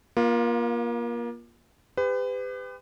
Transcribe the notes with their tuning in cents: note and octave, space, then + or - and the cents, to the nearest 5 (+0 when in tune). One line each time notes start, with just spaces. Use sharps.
A#3 +30 F4 +0
G4 +35 B4 +35